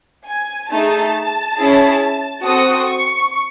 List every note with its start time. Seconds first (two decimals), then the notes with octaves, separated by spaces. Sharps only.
0.26 G#5
0.70 A3 D#4 G#4 A5
1.57 C#4 E4 G#4
2.44 C4 F#4 A4 D#6
2.88 C#6